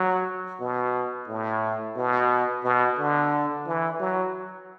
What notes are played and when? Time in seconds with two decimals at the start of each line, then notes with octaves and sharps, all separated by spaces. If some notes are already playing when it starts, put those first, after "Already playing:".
Already playing: F#3
0.60 B2
1.28 A2
1.96 B2
2.64 B2
2.99 D3
3.66 E3
4.00 F#3